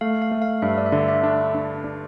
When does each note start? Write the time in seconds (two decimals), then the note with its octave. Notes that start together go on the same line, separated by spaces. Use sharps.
0.01 A3 F5
0.22 F5
0.31 A3
0.42 F5
0.62 G2 E5
0.78 D5
0.86 E5
0.92 D3 D5
1.08 E5
1.23 D4
1.55 D4
1.84 D4